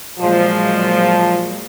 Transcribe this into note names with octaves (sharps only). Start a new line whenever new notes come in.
A#2 F3 F#3 G#3